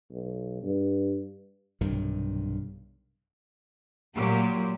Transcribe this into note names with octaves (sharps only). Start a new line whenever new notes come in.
B1
G2
B1 G2 C3 D#3
A#2 F#3 A#3 G4